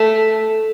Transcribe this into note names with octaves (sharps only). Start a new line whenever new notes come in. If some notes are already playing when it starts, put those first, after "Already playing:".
Already playing: A3